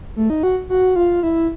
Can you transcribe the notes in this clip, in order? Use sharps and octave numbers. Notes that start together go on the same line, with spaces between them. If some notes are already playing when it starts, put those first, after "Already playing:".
A3
D#4
F#4
F#4
F4
E4